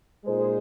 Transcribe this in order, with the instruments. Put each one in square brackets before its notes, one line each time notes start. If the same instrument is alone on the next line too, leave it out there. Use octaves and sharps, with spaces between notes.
[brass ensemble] A#2 G#3 D#4 G#4 C5